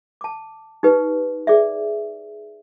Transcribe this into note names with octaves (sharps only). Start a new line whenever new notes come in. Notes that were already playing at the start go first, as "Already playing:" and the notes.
A5 D6
D#4 G4 B4
G#4 D5 E5